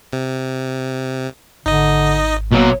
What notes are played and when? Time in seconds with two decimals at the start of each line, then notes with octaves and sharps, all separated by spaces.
0.13 C3
1.66 G#1 D3 D#4 D#5
2.52 B2 F#3 A#3